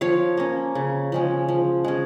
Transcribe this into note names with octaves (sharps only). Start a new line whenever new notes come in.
F3 C#5 F5
A#3 C#4
C#3
F3 G#3 C#4
F3
G#3 C#4